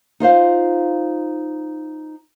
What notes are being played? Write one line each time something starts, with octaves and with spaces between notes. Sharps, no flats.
D#4 F4 C5 F5